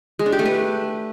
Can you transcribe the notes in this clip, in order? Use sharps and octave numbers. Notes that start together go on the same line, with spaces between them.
G#3
D4
G4
A3
B4